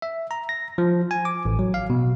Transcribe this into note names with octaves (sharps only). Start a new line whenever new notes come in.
E5
A#5
A#6
F3
G#5
D6
A1
F#3
F5
B2